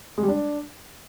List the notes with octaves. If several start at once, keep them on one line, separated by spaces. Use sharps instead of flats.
G#3
G3
D4